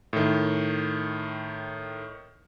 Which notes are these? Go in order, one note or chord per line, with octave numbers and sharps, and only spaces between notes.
A2 D#3